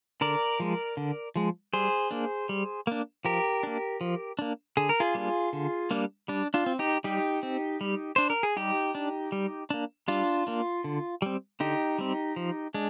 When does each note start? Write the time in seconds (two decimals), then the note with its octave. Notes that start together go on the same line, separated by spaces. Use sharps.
0.21 D3 A#4 D5
0.60 F3 G#3
0.97 D3
1.36 F3 G#3
1.73 G3 G#4 C5
2.11 A#3 D4
2.49 G3
2.87 A#3 D4
3.25 F3 G4 A#4
3.63 A#3 D4
4.01 F3
4.39 A#3 D4
4.77 D3 G#4
4.89 A#4
5.00 F4 G#4
5.15 G3 A#3 D4
5.53 D3
5.91 G3 A#3 D4
6.28 G3 D4
6.54 D4 F4
6.66 C4
6.79 D#4 G4
7.04 G3 D#4 G4
7.43 C4
7.81 G3
8.16 D4 C5
8.30 A#4
8.43 G#4
8.57 G3 D#4 G4
8.95 D4
9.32 G3
9.70 A#3 D4
10.08 G3 D4 F4
10.47 A#3 D4
10.84 D3
11.22 G3 C4
11.60 D3 D#4 G4
11.98 G3 C4
12.36 F3
12.74 G#3 D4